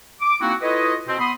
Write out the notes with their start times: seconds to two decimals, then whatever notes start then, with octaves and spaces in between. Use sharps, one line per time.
0.21 D6
0.41 A#3 C4 D#4 E4 F#4
0.62 E4 F4 A4 B4 C#5 D#5
1.07 B2 C4
1.19 B3 B5 C6 D#6